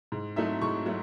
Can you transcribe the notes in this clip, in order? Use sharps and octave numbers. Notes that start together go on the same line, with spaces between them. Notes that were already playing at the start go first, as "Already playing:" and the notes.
G#2
F#3 A3 D#4 E5
G#2 C#6
F#3 A3